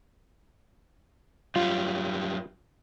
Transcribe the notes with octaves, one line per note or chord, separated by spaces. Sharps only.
F#2 G3 F4